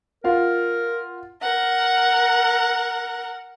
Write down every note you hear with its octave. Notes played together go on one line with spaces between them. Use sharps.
F4 A#4 F5 F#5
A#4 F#5